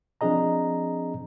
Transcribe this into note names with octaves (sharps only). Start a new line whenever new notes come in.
F3 C4 D4 G#4 D#5 A#5